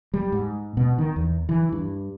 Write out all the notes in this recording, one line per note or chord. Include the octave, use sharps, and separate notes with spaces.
G3
G#2
B2
D#3
E2
E3
G2